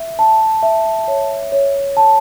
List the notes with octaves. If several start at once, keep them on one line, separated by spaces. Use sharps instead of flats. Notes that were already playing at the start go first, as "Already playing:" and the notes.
Already playing: E5
A5
E5
C#5
C#5
A5